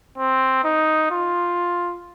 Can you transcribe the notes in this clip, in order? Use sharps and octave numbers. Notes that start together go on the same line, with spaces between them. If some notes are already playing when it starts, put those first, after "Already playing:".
C4
D#4
F4